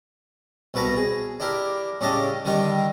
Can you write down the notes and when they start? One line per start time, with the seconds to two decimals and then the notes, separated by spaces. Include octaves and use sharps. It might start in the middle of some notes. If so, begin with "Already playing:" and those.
0.74 C2 B2 B4 A5 A#5
0.96 G#4
1.40 D4 E4 G4 A#4
2.01 A2 C#3 D4 G4 D#5 A5
2.45 D3 D#3 G3 D4 D#4